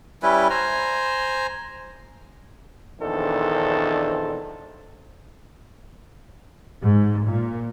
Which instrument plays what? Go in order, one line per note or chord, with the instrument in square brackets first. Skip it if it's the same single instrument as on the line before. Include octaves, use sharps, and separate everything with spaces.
[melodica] G3 C#4 E4 B4
C5 G#5 A#5
[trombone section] A#1 E2 D#3 D4 A4 C5
[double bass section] G#2
A#2